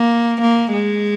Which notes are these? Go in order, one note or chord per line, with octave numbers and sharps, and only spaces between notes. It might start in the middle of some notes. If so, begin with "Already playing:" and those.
Already playing: A#3
A#3
G#3